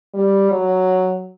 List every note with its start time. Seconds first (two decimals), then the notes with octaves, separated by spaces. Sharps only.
0.14 G3
0.51 F#3